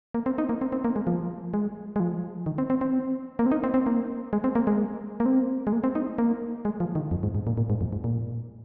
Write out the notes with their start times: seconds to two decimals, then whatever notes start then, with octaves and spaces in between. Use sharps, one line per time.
0.14 A#3
0.26 C4
0.38 D#4
0.49 A#3
0.61 C4
0.72 C4
0.84 A#3
0.96 G#3
1.07 F3
1.54 G#3
1.96 G#3
2.00 F3
2.46 D#3
2.58 C4
2.70 C4
2.81 C4
3.39 A#3
3.46 C4
3.51 D#4
3.64 C4
3.74 C4
3.86 A#3
4.33 G#3
4.44 C4
4.55 A#3
4.67 G#3
5.20 A#3
5.26 C4
5.67 G#3
5.73 A#3
5.84 C4
5.95 D#4
6.18 A#3
6.65 G#3
6.80 F3
6.95 D#3
7.11 F2
7.23 G#2
7.35 G#2
7.47 A#2
7.57 A#2
7.70 G#2
7.81 F2
7.93 G#2
8.04 A#2